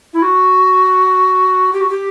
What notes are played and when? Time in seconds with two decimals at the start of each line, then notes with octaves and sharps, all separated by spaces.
0.13 E4
0.22 F#4
1.73 G4
1.81 F#4
1.90 G4